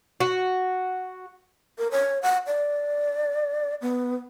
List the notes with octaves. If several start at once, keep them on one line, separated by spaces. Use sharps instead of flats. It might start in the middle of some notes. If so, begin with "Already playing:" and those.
F#4
A#4
C#5
F#5
D5
B3